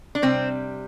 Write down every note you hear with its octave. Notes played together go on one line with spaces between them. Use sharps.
D4
C3 G3 C4